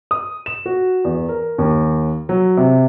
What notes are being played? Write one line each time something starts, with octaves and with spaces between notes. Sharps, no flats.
D#6
E7
F#4
E2
A#4
D#2
F#3
C3